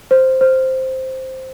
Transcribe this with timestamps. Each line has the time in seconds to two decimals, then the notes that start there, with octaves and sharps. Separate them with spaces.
0.11 C5
0.41 C5